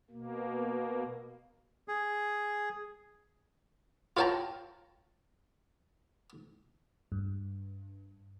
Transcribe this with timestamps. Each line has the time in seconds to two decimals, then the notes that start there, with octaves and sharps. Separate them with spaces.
0.11 B2 A#3
1.88 G#4
4.17 F4 C#5 F5 G5 A5 A#5
7.12 G2